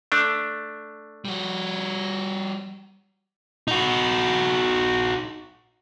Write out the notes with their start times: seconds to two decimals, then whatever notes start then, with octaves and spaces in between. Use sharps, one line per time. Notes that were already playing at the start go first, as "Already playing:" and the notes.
0.12 A3 D4
1.25 G3 F#4
3.68 D#4 F#4